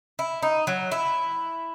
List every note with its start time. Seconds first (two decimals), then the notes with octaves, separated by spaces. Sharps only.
0.19 E4
0.42 D#4
0.67 F#3
0.92 E4